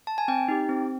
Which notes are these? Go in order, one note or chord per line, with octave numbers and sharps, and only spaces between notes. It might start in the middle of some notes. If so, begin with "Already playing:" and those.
A5
G#5
C4 G5
D#4 G4
C4